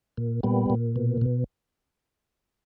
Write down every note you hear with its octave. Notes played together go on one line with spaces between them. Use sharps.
A#2
A#2 G3 B3
A#2
B2
B2